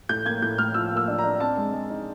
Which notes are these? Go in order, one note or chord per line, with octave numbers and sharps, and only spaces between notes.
A2 G6
A#3 G#6
A2 G6
A2 F6
F3 E6
A#3
E6
D4
A#5
D4
C4 A5
G#3
G#3
D#4